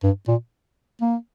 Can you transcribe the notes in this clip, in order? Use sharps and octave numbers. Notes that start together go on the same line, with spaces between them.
G2
A#2
A#3